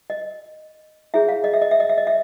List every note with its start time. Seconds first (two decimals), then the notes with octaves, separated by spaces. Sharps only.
0.10 D#5
1.14 E4 G#4 C#5 E5
1.29 F5
1.44 D#5
1.53 E5
1.62 D#5
1.71 E5
1.80 D#5
1.89 E5
1.98 D#5
2.07 E5